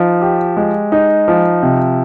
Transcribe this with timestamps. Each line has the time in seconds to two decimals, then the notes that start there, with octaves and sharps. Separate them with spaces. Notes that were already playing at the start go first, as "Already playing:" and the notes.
Already playing: F3 D#4
0.22 G4
0.57 G#3
0.92 D#4
1.28 F3
1.63 C3